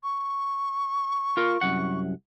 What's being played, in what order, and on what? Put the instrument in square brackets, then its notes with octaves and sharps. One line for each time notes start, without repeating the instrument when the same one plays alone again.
[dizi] C#6
[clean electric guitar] F4 A#4
C2 F#2 F#5